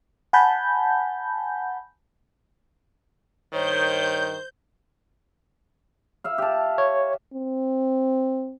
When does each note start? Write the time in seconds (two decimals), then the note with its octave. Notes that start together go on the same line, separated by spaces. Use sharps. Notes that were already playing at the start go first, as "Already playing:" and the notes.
0.33 F#5 G#5 A5 B5 G6
3.53 G2 D#3 C5 C#5 G6
6.24 E5 F5
6.38 G4 A5
6.78 C#5
7.33 C4